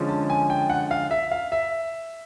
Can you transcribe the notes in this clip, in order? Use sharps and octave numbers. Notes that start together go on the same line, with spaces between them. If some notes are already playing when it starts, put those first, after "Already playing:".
Already playing: D3 F3 G#3 C#4
A5
G#5
G5
F#5
F5
E5
F5
E5